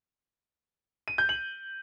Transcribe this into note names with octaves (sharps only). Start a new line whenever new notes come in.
D#7
G6
F#7